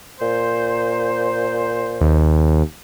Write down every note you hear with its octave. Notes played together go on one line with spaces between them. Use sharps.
A#2 C5
D#2